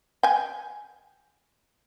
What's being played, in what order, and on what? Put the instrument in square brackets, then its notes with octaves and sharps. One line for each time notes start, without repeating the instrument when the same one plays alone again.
[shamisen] G5 G#5